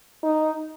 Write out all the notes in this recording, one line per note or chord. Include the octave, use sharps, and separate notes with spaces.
D#4